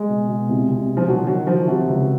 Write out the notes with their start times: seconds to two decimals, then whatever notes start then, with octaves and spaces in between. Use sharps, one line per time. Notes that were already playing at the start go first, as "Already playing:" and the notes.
Already playing: G#3
0.09 B2
0.28 B2
0.49 C2
0.68 C2
0.88 B2
0.97 F3
1.07 D#3 F#3
1.27 D#3 F#3
1.47 D#3 F3
1.67 C3 F#3
1.87 C#2